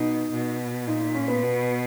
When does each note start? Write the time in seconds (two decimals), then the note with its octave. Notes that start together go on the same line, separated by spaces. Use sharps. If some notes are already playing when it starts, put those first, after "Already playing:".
Already playing: B2 D#4
0.32 B2
0.87 A#2 D#4
1.01 D#4
1.15 C#4
1.28 B3
1.43 B2